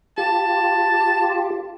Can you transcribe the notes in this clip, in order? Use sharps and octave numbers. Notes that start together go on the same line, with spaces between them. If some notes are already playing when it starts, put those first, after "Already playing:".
F4 G4 A5